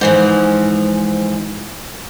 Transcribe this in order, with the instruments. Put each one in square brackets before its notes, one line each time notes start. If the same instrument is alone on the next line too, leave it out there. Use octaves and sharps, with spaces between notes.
[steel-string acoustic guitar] G#2 E3 F3